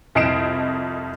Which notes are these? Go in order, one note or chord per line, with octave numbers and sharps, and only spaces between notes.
C2 F2 D#5 C7 D7 E7